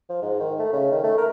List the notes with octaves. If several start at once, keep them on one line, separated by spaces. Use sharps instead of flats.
F3
G#2
D#3
A3
C#3
D#3
A3
A#4